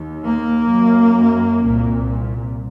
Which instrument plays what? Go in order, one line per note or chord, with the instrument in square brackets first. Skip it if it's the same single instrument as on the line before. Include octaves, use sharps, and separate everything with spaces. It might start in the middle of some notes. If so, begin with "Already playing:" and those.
Already playing: [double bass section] D#2
A#3
F#2
C2 A#2